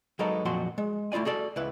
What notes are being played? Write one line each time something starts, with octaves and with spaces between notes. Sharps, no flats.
F#3 G#3 B3 D#4 A4 A#4
F2 A#2 F3 F#3 F#4 C6
G#3
A3 E4 F4 D5 G#5
F#4 G#4 A4 D5
C#2 E4 B4